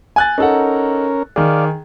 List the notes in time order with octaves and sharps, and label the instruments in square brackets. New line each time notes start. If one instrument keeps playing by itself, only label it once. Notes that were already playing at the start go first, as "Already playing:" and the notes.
[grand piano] G#5 F#6 A6
[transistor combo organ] C#4 A#4 [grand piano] D#4 A4 F#5
[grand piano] D#3 G#4 [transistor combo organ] D5 F5